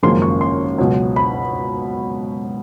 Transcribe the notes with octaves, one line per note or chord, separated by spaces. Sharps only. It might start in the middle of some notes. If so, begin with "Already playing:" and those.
G#1 F#2 C#3 F3 A#3 C6
C#6
C6
C#2 B2 F#3
B5